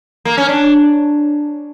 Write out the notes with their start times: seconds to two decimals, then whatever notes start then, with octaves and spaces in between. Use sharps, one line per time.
0.25 A#3
0.38 C#4
0.48 D4